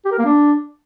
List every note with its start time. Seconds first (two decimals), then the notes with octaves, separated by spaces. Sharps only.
0.05 G4
0.12 A#4
0.19 A#3
0.25 D4